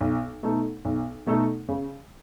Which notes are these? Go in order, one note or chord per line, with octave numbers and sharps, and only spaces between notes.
B1
B2 A3 D#4 A4
B1
B2 A3 D#4 A4
C#3